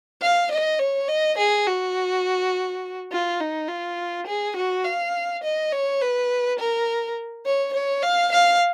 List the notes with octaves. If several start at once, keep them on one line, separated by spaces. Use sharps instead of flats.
F5
D#5
C#5
D#5
G#4
F#4
F4
D#4
F4
G#4
F#4
F5
D#5
C#5
B4
A#4
C#5
C#5
F5
F5